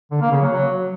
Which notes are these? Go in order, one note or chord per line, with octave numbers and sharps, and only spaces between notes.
D3
A#3
C#3
F#3
F#3